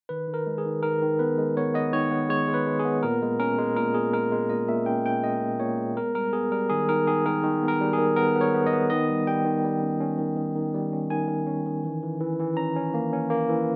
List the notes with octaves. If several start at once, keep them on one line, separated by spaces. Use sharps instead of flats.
D#3 B4
D#3
A#4
G#3
G#4
D#3
D#3 A#4
D#3
B3 B4
G#3
B3 C#5
B3 D#5
D#3 C#5
B3
G#3 C#5
G#3
B4
G#3
G#4
B3
A#2 A#4
G#3
C#4 A#4
G#3
A#2 A#4
A#2 G#4
G#3 A#4
G#3
A#2 D#5
A#2 E5
C#4 G5
C#4 G5
G#3 D#5
A#2
A#2 C#5
G#3
B3 A#4
G3 A#4
B3 G#4
G3 A#4
D#3 G#4
D#3 A#4
D#3 G#4
D#3 A#4
D#3
B3
A#4
G3
G#4
D#3
B3 A#4
B3
C#5
B3
D#5
B3
D#3 D#5
G3
G3 G5
D#3
G3
C#4
C#4
D#3
D#3
D#3
G3
C#4
D#3 G#5
D#3
C#4
D#3
E3
E3
E3
E3
C#4 A#5
C#4
A#3
C#4
A#3
E3